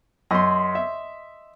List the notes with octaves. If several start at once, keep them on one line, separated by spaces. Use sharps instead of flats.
F#2 D#5 C6
E5